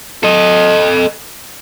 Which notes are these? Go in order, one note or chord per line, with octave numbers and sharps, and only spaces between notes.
A4 D#5